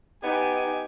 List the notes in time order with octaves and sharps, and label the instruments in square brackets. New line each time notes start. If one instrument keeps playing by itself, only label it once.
[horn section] B3 G4 G#5 [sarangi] D#4